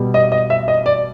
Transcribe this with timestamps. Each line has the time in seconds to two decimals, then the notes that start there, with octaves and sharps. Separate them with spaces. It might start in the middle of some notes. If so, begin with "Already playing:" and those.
Already playing: B2 G3
0.14 D#5
0.32 D#5
0.50 E5
0.68 D#5
0.86 D5